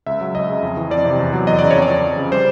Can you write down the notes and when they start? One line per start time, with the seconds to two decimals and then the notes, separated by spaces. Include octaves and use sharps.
0.06 C#2 E5
0.21 F#3
0.35 C#2 D#5
0.49 C#3
0.63 F2
0.77 E3
0.90 F2 D5
1.05 C3
1.19 E2
1.33 F#3
1.47 E2 D#5
1.59 C#3 D5
1.70 F2 C#5
1.82 D5
1.89 F3
2.04 F2
2.17 C#3
2.32 G3 C5